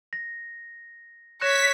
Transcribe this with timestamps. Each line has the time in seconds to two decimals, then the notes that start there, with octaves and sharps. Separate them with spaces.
0.13 A#6
1.41 C#5 F#6 A#6 B6 E7